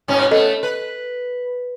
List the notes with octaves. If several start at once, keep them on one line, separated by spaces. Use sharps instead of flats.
G#2 B2 C#4
A3 B3 A4 D#5
B4